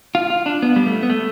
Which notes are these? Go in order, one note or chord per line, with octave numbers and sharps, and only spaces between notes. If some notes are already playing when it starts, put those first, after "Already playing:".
F4
F4
D4
B3
G3
A3
B3
A3